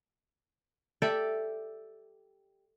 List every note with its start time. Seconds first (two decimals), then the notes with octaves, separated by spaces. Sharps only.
1.02 G4 A4 D5 E5